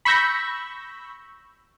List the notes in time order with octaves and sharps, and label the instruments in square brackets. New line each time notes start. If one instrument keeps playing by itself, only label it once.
[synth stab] B5 C#6 E6 G6 A#6